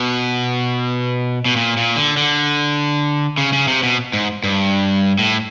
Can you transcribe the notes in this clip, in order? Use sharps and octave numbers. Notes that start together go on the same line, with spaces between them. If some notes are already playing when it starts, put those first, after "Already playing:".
Already playing: B2
B2
A#2
A#2
D3
D3
C#3
C#3
C3
B2
G#2
G2
A2